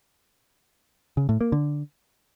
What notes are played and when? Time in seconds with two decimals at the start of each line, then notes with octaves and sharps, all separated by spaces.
1.17 C#3
1.29 A2
1.41 A#3
1.52 D3